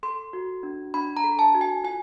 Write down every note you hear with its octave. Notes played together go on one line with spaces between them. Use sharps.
A4 C6
F#4
D4
D4 B5
A#5
A4
A5
F#4
G#5
F4 G#5